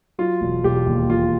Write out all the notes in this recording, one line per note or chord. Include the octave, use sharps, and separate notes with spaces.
F#3 F4
E1
E1 G4
D#2
E1 F4